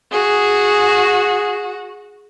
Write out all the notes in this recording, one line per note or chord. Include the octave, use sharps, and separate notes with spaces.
F#4 G#4